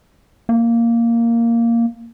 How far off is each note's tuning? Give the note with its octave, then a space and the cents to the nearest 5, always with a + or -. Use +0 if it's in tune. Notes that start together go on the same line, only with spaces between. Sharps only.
A#3 -5